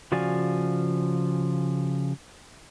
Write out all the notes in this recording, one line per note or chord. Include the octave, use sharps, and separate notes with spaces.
C#3 F3 F#4 D5 F5 G#5